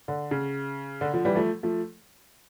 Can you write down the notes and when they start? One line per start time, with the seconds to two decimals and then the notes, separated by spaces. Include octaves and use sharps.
0.08 D3
0.31 C#3
1.01 D3
1.14 D3 F3
1.25 E3 G3
1.36 F3 A3
1.63 F3 A3